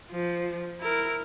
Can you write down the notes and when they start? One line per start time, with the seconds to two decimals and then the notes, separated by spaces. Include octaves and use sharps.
0.11 F3
0.80 E4 A#4